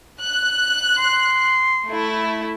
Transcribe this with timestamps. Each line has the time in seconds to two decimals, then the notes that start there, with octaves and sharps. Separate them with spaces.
0.21 F#6
0.98 C6
1.87 A3 E4